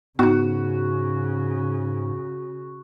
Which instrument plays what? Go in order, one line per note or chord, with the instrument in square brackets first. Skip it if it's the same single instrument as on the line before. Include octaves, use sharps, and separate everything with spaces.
[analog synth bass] G#2 [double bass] C#3 [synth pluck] B3 D#4 [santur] F#4